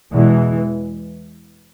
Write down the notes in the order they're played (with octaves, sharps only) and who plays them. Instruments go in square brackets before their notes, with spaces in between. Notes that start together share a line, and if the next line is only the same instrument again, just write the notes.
[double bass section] E2 B2 E3 G#3